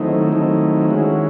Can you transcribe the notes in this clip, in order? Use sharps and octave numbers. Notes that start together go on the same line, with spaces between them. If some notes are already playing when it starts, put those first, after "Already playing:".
Already playing: D#3 F#3 A3 C4 D#4 E4
D#3 F#3 A3 C4 D#4
D#3 G#3 C#4 E4 F#4